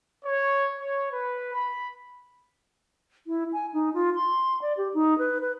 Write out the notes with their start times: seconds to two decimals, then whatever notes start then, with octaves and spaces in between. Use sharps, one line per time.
0.24 C#5
0.78 C#5
1.12 B4
1.54 B5
3.27 E4
3.53 G#5
3.73 D#4
3.94 F4
4.15 C6
4.62 D5
4.77 G4
4.94 D#4
5.18 B4
5.41 B4